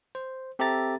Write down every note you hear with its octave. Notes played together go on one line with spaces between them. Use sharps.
C5
C4 G4 A4 E5 A#5 A6